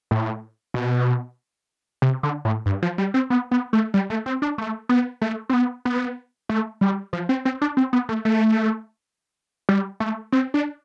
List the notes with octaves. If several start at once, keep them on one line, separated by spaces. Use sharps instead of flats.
A2
B2
C3
D3
A2
G2
F3
G3
C4
B3
B3
A3
G3
A3
C4
D4
A3
B3
A3
C4
B3
B3
A3
G3
F3
C4
C4
D4
C4
B3
A3
A3
G3
A3
C4
D4